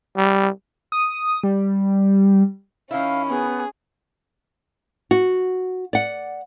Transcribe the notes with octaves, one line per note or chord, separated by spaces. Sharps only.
G3
D#6
G3
D#3 C#4 E4 F5
B3 G#4
F#4
D5 F#5